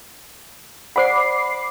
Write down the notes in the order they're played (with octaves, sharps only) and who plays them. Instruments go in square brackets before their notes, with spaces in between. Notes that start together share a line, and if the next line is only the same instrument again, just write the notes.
[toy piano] C5 D5 F#5 [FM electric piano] B5 D6 C7